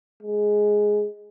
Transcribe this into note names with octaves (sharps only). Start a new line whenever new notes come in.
G#3